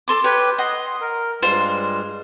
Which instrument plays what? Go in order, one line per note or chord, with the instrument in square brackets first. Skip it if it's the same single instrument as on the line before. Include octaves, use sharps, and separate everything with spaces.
[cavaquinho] A4 C6 D6
[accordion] G4 B4 [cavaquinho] C#5
[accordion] D#5 C6 [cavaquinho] F#5
[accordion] A#4
[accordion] G2 G3 G#3 [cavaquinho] F4 C5